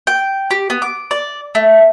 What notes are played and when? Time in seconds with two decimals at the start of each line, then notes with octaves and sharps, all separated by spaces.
0.07 G5
0.51 G4
0.70 B3
0.82 D6
1.11 D5
1.55 A3